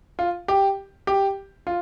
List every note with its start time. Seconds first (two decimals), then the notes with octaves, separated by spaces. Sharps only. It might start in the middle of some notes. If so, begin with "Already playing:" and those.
0.19 F4
0.48 G4
1.07 G4
1.67 F4